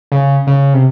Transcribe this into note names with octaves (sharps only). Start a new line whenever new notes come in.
C#3
C#3
C3